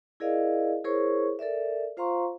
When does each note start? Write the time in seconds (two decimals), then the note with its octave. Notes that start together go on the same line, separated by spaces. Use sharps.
0.20 E4 G#4 A#4 D5 D#5 F5
0.84 E4 G#4 A#4 C5 C#5 C#6
1.39 A4 A#4 D5 E5
1.97 F4 C5 F5 A#5 C6 C#6